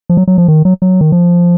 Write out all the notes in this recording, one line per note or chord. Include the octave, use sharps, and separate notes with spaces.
F3
F#3
F#3
F3
D#3
F#3
F#3
D#3
F3